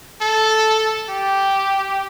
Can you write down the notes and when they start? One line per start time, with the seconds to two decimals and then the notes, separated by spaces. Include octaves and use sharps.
0.22 A4
1.10 G4